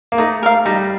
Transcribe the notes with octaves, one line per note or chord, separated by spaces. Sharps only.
A#3
A3 D#4
A#4 F5
G3 D#4